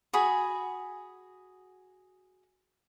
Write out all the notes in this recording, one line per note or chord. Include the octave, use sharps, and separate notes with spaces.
F#4 G#4 B5